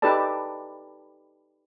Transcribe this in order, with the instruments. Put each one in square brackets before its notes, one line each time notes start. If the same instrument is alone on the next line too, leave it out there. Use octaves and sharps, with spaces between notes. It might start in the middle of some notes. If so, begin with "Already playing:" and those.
[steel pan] D#4 G4 A4 B4 D5 A5